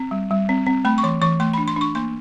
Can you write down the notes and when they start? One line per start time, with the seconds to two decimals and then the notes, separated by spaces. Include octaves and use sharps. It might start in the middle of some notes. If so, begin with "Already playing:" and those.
Already playing: C4
0.11 G3
0.31 G3
0.49 C4
0.66 C4
0.85 A3 B5
0.98 C#6
1.03 E3 C6
1.21 E3 C#6
1.40 A3 C6
1.54 D4 B5
1.68 C6
1.76 D4 C#6
1.95 A#3 C6